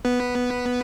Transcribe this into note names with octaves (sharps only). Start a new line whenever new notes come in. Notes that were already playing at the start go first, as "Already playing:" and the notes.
B3 B4